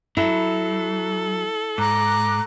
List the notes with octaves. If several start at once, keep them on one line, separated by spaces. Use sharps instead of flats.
F#3 E4 A4
G#2 A#5 D6 F#6